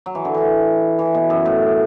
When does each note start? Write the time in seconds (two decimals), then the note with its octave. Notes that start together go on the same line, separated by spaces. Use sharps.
0.06 F#3
0.15 E3
0.25 D3
0.34 E3
0.99 E3
1.15 B2
1.30 F#2
1.46 A2